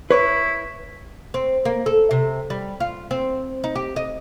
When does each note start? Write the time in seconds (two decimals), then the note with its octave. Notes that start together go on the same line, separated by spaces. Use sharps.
0.11 E4 B4 C#5
1.34 C4
1.65 A#3
1.86 A4
2.11 C3
2.50 G3
2.80 F4
3.11 C4
3.64 D#4
3.76 G4
3.96 D#5